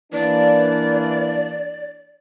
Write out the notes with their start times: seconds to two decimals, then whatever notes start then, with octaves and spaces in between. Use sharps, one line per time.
0.13 E3 A#3 D4 D5